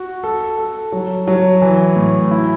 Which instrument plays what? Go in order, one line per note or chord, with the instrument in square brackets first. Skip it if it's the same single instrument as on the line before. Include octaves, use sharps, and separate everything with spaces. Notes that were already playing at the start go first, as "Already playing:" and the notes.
Already playing: [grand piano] F#4
A4
A4
F#3
F#3
E3
A2
E4